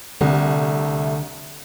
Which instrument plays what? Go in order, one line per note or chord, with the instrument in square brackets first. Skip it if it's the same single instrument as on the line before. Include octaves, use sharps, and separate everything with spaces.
[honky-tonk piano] C2 [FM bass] D3 [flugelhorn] A3